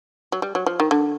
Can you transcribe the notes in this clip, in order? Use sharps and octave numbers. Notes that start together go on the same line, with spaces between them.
F#3
G3
F#3
F3
D#3
D3